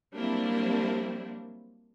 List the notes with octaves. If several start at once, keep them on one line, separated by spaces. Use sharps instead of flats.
F#3 G3 A#3 C4 D4 E4